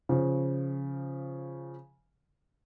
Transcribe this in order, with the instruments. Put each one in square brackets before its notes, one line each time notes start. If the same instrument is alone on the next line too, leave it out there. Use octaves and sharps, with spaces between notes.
[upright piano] C#3 F3